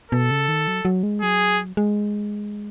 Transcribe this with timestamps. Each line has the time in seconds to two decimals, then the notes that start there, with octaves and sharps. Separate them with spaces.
0.12 B2 A4
0.31 C#3
0.48 D#3
0.68 F#3
0.85 F#3
1.03 G#3
1.22 F#3 G#4
1.77 G#3